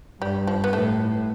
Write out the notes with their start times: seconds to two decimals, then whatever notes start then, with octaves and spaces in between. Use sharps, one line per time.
0.21 G2 G3
0.47 F3
0.64 B3
0.73 A2 A3